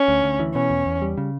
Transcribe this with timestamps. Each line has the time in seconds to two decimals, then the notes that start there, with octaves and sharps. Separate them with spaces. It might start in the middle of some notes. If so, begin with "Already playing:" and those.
Already playing: C#4
0.08 D2
0.24 D2
0.39 E3
0.55 B2 C#4
0.70 E2
0.86 E2
1.02 G3
1.18 C#3